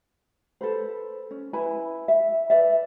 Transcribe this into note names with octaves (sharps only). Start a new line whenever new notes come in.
A4 B4 C5
C#4
E4 B4 G#5 B5
E5
B4 D5 E5